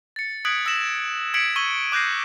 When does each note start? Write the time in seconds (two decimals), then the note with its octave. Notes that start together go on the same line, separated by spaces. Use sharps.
0.16 A6 C#7
0.45 D#6 F#6 G#6 B6 D7 F#7
0.65 D#6 E6 A#6 E7 F#7
1.34 E6 G#6 B6 C#7 D7 F#7
1.56 C#6 E6 G#6 D#7 F#7 G7
1.92 D6 F#6 G6 A#6 C7